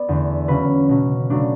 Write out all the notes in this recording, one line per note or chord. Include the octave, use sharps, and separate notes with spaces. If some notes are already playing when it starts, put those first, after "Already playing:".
Already playing: B3 D5
E2 D3 A3 D4
C#3 F#3 C#4 B4
B2 F#3 C#4
C#3 F#3 A3 D4